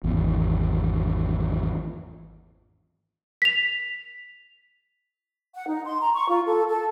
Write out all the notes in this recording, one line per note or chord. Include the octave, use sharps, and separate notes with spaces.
G#1 E2
B6 F7
F#5
D#4
C6
A#5
C#6
F4
A4
A4